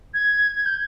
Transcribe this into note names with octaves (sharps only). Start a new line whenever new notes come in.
G#6
G#6
G6